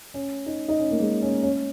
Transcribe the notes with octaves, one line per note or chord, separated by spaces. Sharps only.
C#4
D#4
D#4
C#4
A#3
G#3
C#4
C#4